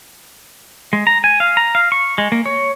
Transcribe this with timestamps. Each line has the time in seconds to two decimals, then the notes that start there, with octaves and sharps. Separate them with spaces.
0.93 G#3
1.07 A#5
1.24 G#5
1.40 F5
1.57 A#5
1.75 F5
1.92 C#6
2.18 G#3
2.32 A#3
2.46 C#5